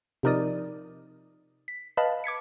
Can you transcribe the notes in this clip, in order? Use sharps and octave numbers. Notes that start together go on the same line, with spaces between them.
C3 F3 D#4 A#4 D5 D#6
B6
B4 D#5 F5 A5 B5
D6 G#6 B6 C#7